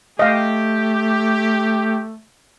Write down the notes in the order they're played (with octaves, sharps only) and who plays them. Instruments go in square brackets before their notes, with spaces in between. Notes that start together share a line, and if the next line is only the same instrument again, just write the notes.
[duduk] A3 [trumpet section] G4 [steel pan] D#5 F5